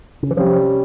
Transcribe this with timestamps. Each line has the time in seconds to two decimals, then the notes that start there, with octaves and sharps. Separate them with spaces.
0.23 C#3
0.31 E3
0.37 C3 F3 G3 C#4